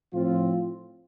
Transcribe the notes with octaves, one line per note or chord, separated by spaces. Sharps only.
A2 F3 C4 F4